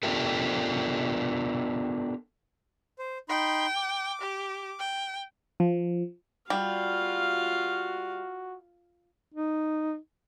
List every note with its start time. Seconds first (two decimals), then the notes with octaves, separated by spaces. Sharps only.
0.03 B3 D4 F4 G4 A4 A#4
2.99 C5
3.29 D#4 G5 B5 C6
3.76 D6
4.21 G4
4.79 G5
5.60 F3
6.50 G3 F4 F#4 F5
9.34 D#4